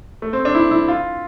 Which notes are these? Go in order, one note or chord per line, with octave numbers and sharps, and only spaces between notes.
A3
C4
D4
E4
E4
F4